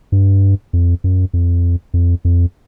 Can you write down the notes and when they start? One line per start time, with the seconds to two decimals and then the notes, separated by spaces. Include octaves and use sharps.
0.12 G2
0.73 F2
1.04 F#2
1.33 F2
1.94 F2
2.25 F2